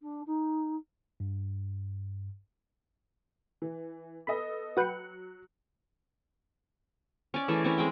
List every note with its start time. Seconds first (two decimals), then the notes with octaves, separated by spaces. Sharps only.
0.02 D4
0.26 D#4
1.20 G2
3.62 E3
4.27 B3 A4 D#5 B5
4.77 F#3 F#4 B4 G5 F#6 C#7
7.34 C#4 D5
7.48 E3 A3 G#4
7.64 C4 C#4 E4
7.78 G#3 C4 G5